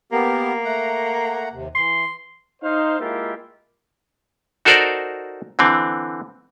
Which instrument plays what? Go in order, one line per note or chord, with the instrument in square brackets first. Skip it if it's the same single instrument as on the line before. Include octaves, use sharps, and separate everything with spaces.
[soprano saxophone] A#3 [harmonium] B3 G4 A#4
[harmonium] A3 F#5 A#5
D#2 C3
[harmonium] E3 [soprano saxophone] C6
[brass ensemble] D#4 C5 F5
G#3 A#3 E4 F4 G4 E5
[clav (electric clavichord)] D#4 F#4 A4 A#4 C5 D5
D3 E3 C4